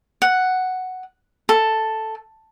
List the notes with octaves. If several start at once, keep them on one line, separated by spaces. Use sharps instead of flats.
F#5
A4